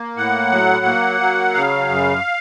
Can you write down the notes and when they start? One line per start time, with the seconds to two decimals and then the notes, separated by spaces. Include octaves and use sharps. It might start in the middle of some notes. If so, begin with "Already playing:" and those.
Already playing: A#3
0.16 A2 F#5
0.51 F#3
0.85 A#3
1.20 F#3
1.54 C#3 F5
1.89 F#2